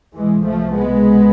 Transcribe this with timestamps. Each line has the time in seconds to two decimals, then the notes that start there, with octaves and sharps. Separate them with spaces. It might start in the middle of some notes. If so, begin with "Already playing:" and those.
0.15 C2 B2 E3 G#3
0.45 F3 A3
0.74 G#3 B3